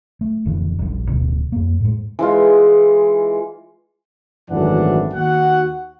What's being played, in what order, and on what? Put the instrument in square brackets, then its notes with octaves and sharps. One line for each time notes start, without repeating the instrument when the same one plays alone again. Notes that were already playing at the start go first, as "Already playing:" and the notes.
[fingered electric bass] A3
D#1 F2 D3 E3
D#1 A#1 C3 G3
D1 D2 B2
F2 A#3
A2 G#3
[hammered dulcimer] E3 G#3 F4
[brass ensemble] G#1 F#2 E3 A3 D4 F#5
D#2 F#4 F#5